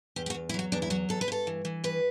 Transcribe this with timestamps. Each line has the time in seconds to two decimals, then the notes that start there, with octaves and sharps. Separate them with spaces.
0.16 E2 G4
0.26 G4
0.30 F#4
0.34 E2
0.49 E4
0.54 F#3 F#4
0.72 E2 D4
0.82 E4
0.90 F#3 F#4
1.09 E2 A4
1.21 B4
1.28 G2 A4
1.47 E3
1.65 E3
1.84 G2 B4